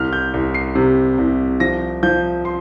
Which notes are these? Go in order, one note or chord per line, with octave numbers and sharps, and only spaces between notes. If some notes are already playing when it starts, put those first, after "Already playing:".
Already playing: C2 F6
G6
C2
C7
C3
C2
F3 A#6
F3 G6
C6